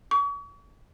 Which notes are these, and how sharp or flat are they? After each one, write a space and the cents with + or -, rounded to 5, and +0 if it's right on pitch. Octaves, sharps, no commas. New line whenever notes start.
C#6 +40